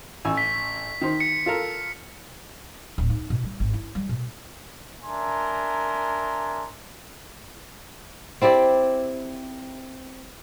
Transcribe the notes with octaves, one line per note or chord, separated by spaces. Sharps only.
A1 G#5 E6
B6
D#3 C5
C#7
F4 A4 A#4
D1
D#4
B2
G3
G#1
E4
G3
B2
D4 A#4 E5 G#5 A#5 C6
C4 E4 G4 D5